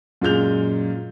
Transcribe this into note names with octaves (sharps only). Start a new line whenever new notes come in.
F#2 A#2 G#3 G6 F7